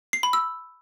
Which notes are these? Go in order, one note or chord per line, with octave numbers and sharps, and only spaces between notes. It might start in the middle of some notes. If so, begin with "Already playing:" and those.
C7
B5
E6